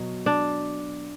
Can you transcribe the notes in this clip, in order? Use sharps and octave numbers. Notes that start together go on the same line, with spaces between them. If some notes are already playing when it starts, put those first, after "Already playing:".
Already playing: B2 F#3
D4